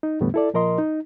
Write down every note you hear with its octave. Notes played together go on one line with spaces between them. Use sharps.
D#4
E2 A2 D3 G3 A3 B3
E4 A4 D5
A#2 F3 A#4 D#5 C6
D#4